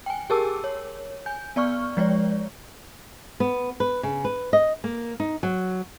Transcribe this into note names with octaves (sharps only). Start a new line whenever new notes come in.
G5 G#5
G4 G#4 A#4 A5 D6 E6
C#5
G#5 G6
B3 D5 C#6 F6
F3 G#3 C#5 D5
B3
B4
C#3
B4
D#5
A#3
D#4
F#3